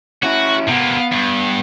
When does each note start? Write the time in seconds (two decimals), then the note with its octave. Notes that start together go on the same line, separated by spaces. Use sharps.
0.23 C#4 E4 F#4
0.69 C3 A#3 B3
1.13 G2